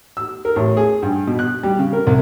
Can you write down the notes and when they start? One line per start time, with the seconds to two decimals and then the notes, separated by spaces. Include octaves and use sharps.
0.17 E6
0.45 A#4
0.56 A1
0.77 G#4
1.02 G2
1.27 B2
1.39 F#6
1.63 G3
1.79 C#3
1.93 A#4
2.07 C2